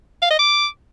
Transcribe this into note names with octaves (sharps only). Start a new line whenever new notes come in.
F5
D#5
D6